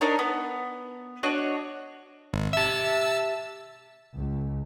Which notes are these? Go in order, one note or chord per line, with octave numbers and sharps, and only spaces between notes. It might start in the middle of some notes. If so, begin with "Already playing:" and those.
D4 D#4 A#4 C#5
B3
D4 F#4 C#5 D#5
G#1
G4 E5 A5 E6
C#2